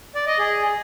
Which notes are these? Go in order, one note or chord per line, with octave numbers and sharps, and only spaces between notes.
D5
D#5
G#4